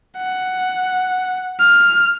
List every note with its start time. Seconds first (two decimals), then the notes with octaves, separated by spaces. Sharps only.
0.17 F#5
1.60 F6